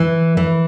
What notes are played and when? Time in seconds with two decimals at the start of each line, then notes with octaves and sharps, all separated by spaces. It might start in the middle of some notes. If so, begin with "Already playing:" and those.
Already playing: E3
0.37 E3